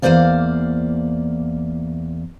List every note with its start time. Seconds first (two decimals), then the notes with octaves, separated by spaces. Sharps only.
0.02 E2 E3 A#3 C5 D5 F5